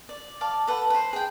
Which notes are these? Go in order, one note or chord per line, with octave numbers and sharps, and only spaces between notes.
D5
D5 F5 A5
A4 B4 F#5
B4 C5
G#4 G5